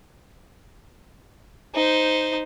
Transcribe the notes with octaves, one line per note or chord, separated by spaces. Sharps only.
D#4 C5